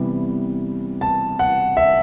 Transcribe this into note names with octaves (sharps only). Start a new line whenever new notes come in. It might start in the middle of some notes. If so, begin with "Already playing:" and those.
Already playing: C3 E3 G3 B3
A5
F#5
E5